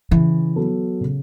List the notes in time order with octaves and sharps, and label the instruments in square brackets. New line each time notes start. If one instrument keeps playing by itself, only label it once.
[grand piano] C#3 [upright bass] E3
[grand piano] F#3 B3 F#4 A4
C#3